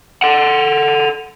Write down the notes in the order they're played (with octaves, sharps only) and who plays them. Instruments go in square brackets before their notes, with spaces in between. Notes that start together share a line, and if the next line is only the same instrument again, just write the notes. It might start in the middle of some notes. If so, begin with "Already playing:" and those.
[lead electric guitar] A4 F#5